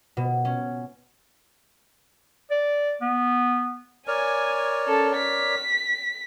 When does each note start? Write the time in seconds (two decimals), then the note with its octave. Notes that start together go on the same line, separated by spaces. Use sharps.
0.17 B2
0.45 C#4
2.51 D5
3.01 B3
4.07 A#4 C#5 D5 G#5
4.86 C#4 A4
5.16 B6